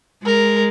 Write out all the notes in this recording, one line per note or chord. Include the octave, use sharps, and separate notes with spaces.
G#3 A#4